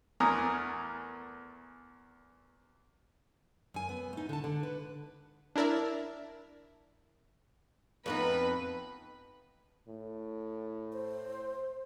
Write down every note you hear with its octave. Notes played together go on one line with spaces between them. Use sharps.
E2 A3 A#4 G#5 A#5 D#6
F#2 G#5
B3
A3 D#4
D3 A5
D3
B4
D4 E4 A#4 D5 E5
F2 B3 D#4 B4
A2
C5